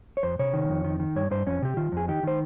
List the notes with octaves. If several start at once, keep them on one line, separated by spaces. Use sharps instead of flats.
C#5
F2 C5
C3 C#5
D#3
F2
D#3
D#3
G2 C#5
G2 C5
F2 C#4
C3 G4
D#3 F4
F2 G#4
D#3 G4
D#3 C5